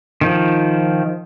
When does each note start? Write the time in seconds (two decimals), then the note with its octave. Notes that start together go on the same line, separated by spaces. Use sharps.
0.21 D#3 F3